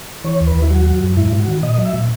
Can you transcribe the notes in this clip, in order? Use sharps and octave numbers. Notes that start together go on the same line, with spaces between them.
E3 C#5
D#2
B4
D#2
E4
F#3 F#4
F#3
F#2
G#2 E4
G#2
F#4
D#3
A#2 D#5
F#3
E5
A#2